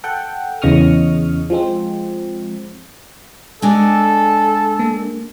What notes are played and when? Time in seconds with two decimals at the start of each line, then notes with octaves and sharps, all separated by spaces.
0.04 A4 F#5 G5
0.62 E2 C#3 D#5 C#6 D#6 F6
1.50 F3 G#3 C4
3.62 G#3 D4 A4 G#5
4.79 A#3